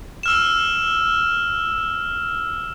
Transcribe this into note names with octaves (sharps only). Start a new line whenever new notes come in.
E6 F6 E7